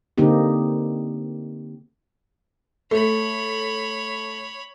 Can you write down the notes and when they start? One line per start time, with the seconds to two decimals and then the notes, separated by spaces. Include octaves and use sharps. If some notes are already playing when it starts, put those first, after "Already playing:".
0.18 D3 A#3 C4 D#4 G4
2.91 A3 C#5 B5